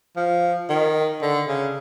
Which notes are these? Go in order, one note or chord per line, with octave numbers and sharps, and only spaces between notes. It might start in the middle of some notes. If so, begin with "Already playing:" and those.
F3
D#3
D3
C#3